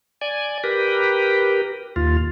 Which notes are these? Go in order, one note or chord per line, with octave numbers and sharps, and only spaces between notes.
D5 G#5
G4 A#4 B4
D#2 F4